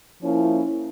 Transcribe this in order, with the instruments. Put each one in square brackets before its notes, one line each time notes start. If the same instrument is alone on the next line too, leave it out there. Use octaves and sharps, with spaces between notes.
[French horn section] F3 A#3 C#4 E4